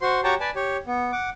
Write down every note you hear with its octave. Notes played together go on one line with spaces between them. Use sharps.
F#4 C5 C6
F#4 G4 C#5 G5 A5 A#5
B4 D5 G#5 A5
G4 C#5
B3
F#5 D6